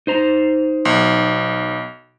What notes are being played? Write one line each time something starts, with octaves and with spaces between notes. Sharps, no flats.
D#4 C5 A#5
B1